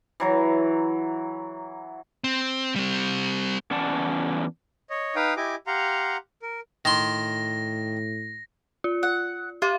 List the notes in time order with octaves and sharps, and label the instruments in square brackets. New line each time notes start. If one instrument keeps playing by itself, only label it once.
[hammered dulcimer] E3 F#3 A#5
[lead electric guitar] C4
G3 C4
[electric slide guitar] E2 C#4 D5 F#5 A5
[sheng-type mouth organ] C#5 D#5
D#4 B4 F5 G5 D#6
E4 G4 D#5 G#5 D6
G4 F5 F#5 A#5 C6
A#4
[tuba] A2 [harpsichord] D#3 C6 [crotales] A#6
[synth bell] F4
[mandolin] F#5
[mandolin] F4 [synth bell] G4 F5